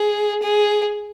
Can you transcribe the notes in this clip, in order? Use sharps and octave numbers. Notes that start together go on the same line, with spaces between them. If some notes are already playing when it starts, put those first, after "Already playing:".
Already playing: G#4
G#4